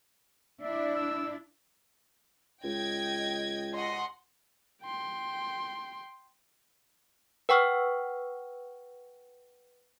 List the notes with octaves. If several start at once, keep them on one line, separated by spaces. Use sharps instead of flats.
D4 E4 E5
E6
C#2 D#5 G5 G#6
D#5 F#5 C6
G5 C6
B4 F#5 G5 C#6 E6 F6